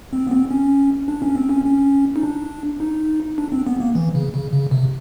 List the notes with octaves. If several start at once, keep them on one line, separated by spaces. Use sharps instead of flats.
C4
B3
C4
C#4
D4
C#4
C4
C#4
C#4
D#4
D4
D#4
D4
C4
B3
A#3
E3
C#3
C#3
C#3
C3